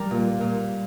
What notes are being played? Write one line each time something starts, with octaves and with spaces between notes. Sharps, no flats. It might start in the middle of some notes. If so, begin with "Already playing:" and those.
Already playing: G3 A#4
A#2
A#2